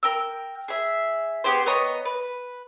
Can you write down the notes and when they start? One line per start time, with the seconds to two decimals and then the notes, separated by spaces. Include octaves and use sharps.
0.03 A#4 G5 E6
0.68 G#4 E5
1.44 B3 G4 G#4 C5
1.66 B3 C#5 D#5 A#5
2.05 B4